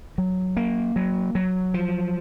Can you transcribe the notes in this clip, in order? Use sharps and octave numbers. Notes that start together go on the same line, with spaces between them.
F#3
A#3
F#3
F#3
F3